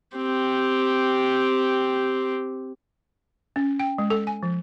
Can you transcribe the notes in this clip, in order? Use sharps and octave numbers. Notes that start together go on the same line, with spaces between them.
C4 G4
C#4
G5
G#3
A4
G#5
F3